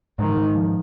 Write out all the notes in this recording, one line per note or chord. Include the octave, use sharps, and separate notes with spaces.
G#2 D#3
G#2
F3